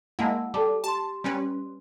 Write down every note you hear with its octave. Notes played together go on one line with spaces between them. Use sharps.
G#3 A#3 E4 F#5 A5 E6
G3 A4 A5 D6
G4 A5 C6
G3 C#4 B4